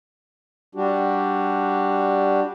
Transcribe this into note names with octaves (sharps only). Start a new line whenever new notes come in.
G3 D4 F#4 G4